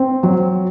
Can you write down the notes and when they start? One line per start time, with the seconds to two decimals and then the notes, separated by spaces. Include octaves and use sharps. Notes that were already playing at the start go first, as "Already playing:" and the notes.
Already playing: C4
0.23 F#3